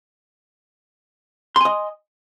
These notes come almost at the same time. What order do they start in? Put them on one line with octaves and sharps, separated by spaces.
C6 G#5 D#5